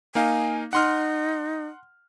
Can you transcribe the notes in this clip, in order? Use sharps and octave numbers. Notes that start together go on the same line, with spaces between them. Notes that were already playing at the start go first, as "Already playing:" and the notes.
A#3 D#4 F5 G#5
D#4 F#5 C6 F6